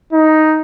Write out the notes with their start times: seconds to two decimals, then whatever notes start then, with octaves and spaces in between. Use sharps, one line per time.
0.12 D#4